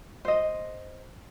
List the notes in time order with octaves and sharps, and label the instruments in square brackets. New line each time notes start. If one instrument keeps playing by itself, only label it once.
[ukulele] C5 D#5